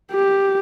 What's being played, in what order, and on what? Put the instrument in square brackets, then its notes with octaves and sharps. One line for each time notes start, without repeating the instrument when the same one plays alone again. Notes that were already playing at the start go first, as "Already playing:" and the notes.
[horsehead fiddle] G4